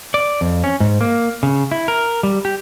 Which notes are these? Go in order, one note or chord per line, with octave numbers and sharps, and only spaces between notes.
D5
F2
C#4
G#2
A#3
C#3
E4
A#4
G3
G4